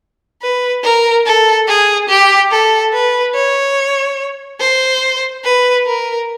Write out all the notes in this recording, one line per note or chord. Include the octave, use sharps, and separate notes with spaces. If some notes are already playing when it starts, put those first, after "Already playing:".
B4
A#4
A4
G#4
G4
A4
B4
C#5
C5
B4
A#4